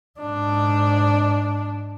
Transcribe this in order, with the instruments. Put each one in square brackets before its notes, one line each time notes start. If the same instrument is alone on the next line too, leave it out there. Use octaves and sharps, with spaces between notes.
[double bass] G#2 D4